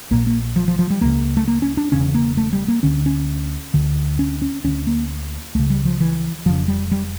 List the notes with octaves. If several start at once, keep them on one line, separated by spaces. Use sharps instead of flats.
A#1 A#2 A#3
A#3
F3
F3
F3
G3
C#2 C#3 A#3
A3
A#3
C#4
D4
E1 E2 C#3 C#4
A#3
A3
G3
A#3
D2 D3 C#4
C#4
D2 D3
C#4
C#4
D2 D3 C#4
A#3
C#2 C#3 A3
G3
F3
E3
F1 F2 C#3 F3
G3
G3